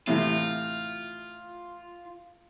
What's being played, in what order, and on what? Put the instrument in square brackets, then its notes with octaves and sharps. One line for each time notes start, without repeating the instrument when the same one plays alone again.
[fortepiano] A2 C3 E3 [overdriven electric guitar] F4